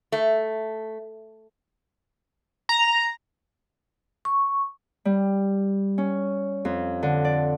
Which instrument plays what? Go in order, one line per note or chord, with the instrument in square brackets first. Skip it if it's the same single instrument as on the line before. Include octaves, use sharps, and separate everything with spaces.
[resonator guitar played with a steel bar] A3
[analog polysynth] A#5
[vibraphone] C#6
[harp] G3
C#4
F2
D3
D5